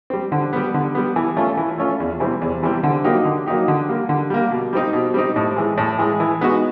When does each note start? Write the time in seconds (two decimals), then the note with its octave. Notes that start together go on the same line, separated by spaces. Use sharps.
0.10 G3 C4
0.32 D3
0.53 G3 B3
0.74 D3
0.95 G3 B3
1.16 E3
1.37 A3 C#4 F4
1.57 E3
1.78 A3 C#4 F4
2.00 E2
2.20 C3 E3 G3 C4
2.42 E2
2.63 C3 E3 G3 C4
2.83 D3
3.04 F#3 A#3 D#4 G4
3.25 D3
3.46 F#3 A#3 D#4 G4
3.68 D3
3.89 G3 A#3
4.09 D3
4.30 G3 A#3
4.51 B2
4.73 G3 C4 D#4
4.93 B2
5.14 G3 C4 D#4
5.36 A2
5.56 E3 G#3
5.78 A2
5.99 E3 G#3
6.20 E3
6.41 G#3 B3 D#4 F#4